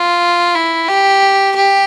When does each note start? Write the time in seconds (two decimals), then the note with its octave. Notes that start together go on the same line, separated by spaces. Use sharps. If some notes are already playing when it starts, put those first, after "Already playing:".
Already playing: F4
0.55 E4
0.88 G4
1.56 G4